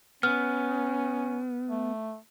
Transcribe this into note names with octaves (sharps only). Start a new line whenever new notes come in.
B3 C#4 F6
A3